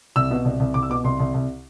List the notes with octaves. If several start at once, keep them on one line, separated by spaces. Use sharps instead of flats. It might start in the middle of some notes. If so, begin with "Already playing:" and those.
C2 E6
B2
C2
C2
C2 D6
E6
B2 D6
C2 C6
C2
C2